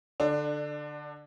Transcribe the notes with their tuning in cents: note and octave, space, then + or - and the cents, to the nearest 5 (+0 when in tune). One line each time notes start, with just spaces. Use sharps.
D3 +0 D4 +25